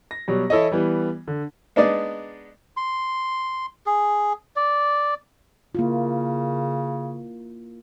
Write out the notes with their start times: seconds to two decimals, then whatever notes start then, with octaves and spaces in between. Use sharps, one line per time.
0.11 A#6
0.28 B2 F#3 G3
0.50 E3 E4 A4 C#5 D#5
0.72 E3 G3 B3
1.28 D3
1.76 G#3 B3 D4 D#4 D5 D#5
2.77 C6
3.86 G#4
4.56 D5
5.75 C#3 A#3 E4 F4